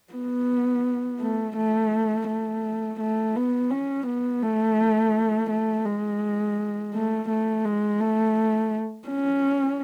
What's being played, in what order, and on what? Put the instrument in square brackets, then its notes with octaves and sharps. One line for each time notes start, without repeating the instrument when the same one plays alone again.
[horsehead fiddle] B3
A3
A3
A3
A3
B3
C#4
B3
A3
A3
G#3
A3
A3
G#3
A3
C#4